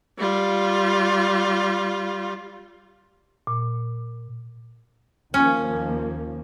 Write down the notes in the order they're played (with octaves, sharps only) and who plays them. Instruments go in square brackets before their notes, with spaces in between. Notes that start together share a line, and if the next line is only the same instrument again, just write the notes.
[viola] G3 F4
[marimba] A#2
[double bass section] D#2 F3 A#3 [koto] C#4